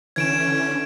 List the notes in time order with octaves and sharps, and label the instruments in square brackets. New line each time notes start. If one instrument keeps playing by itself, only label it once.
[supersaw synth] D3 E3 C#4 [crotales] G#6 D7 E7